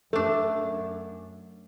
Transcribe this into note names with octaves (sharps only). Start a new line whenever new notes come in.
F#2 A3 D4 A4